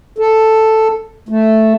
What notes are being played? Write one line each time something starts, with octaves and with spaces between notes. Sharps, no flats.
A4
A3